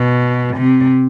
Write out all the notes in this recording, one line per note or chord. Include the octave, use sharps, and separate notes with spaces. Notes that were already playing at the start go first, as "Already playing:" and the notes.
Already playing: B2
C3